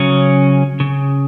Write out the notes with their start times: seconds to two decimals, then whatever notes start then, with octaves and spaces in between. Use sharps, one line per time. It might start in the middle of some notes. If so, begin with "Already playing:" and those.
Already playing: C#3 F#3 C#4
0.80 C#3